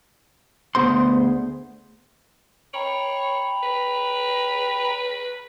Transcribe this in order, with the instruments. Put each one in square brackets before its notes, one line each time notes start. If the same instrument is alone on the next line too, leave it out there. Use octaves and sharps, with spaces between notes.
[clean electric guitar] D2 C3 B3 G#4 C5 C6
[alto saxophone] C#5 [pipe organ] G5 A#5 B5
[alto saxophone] B4